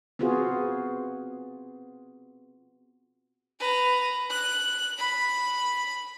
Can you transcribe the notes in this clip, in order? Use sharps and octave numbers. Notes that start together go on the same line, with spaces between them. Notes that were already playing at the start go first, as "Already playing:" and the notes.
B3 C4 F4 F#4 G#4
B4 A#5
F#6
B5